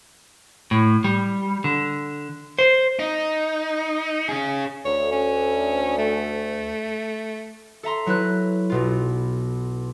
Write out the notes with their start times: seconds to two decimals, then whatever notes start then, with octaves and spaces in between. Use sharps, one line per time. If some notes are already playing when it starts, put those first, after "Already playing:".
0.71 A2
1.04 G3
1.64 D3
2.59 C5
2.99 D#4
4.29 C#4 G#4
4.85 D2 C#5
5.12 C#4
5.98 A3
7.83 A4 E5 A#5 C6
8.06 F#3 E4 B4 F#6
8.70 B1 B2 F4